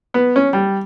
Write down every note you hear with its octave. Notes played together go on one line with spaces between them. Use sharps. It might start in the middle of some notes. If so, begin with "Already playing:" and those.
B3
C#4
G3